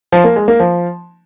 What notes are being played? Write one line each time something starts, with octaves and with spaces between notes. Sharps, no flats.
F3
A#3
G#3
A#3
F3